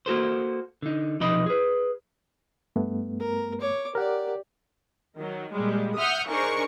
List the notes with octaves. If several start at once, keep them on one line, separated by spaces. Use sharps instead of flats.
A#3 F#4 A4 C5
D3 D#4
B1 C3 F3 D#4 D#5 B5
G#4 B4
G2 A3 B3
A#4
C#5 D6
G4 A#4 D5 F#5
D#3 F#3
A#2 G3 G#3
E5 F#5 D#6 F6 G6
D4 D#4 G#4 A#4 C5 C#6